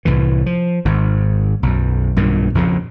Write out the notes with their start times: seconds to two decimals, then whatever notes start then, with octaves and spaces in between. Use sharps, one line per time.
0.05 C2 A2 E3
0.46 F3
0.85 G#1 G#2
1.63 B1 F#2
2.16 B1 G2 A#2 D#3
2.55 A#1 F2 A#2 C#3